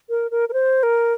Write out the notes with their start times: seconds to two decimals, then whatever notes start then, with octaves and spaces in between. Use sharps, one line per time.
0.09 A#4
0.31 A#4
0.49 A#4
0.53 C5
0.83 A#4